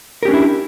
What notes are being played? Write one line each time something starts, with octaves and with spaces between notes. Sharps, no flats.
C#4 D4 E4 G4 A#4